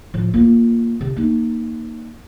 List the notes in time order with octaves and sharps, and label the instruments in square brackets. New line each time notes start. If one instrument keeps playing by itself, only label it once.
[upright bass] A2 F3
A#3 F4
C3
A#3 D#4